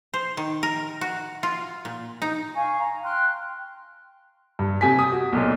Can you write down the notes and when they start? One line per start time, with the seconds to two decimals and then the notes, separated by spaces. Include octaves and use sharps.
0.14 C5
0.37 D#3
0.63 A#4
1.01 F#4
1.43 F4
1.85 A#2
2.22 D#4
2.55 F5 G#5 C#6
2.79 A#5
3.04 G5 C6 F6 F#6
4.59 G2
4.81 C3 G4 G#5 B6
4.99 D#6
5.12 F#4
5.33 B1 A#2